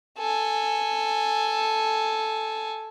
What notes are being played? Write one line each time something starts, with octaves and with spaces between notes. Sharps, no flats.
A4 G#5